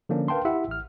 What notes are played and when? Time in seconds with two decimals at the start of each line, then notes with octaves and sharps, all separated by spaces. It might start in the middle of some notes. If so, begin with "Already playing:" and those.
0.09 D3 F3 A#3 C#4 D4
0.28 A#4 B4 F5 G5 A5 C6
0.45 E4 G4 E5 F#5
0.68 A1 F6